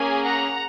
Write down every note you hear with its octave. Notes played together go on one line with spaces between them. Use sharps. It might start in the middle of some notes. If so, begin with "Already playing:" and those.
Already playing: A#3 C#4 G#4 G#5
F#5 A#5